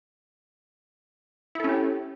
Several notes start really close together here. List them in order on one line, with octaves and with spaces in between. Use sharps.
E4 A4 C#4 G4